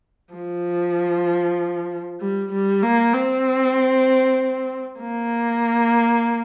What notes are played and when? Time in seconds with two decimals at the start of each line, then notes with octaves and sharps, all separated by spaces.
0.34 F3
2.20 G3
2.52 G3
2.82 A#3
3.13 C4
5.00 A#3